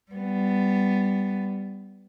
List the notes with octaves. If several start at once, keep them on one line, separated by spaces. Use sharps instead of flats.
G3 B3